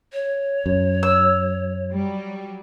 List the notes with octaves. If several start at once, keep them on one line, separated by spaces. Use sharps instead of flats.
C#5
F#2
E6
F#3 G3